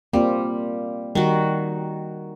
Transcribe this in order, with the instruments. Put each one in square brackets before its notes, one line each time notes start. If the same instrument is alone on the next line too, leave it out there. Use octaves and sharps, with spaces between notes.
[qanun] G3 [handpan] A#3 C4 F4
[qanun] D#3 F#4 [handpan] G3